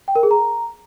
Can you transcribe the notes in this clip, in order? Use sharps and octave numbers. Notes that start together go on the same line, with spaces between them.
G5
A#4
G#4
A#5